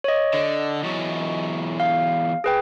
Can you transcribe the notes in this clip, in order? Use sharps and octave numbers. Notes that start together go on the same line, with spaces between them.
C#5 D#5
D3 D#5
E2 F#3
F5
G#4 B4 G5